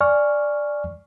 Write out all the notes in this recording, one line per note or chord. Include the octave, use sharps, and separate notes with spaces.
D5 G#5 C#6 F6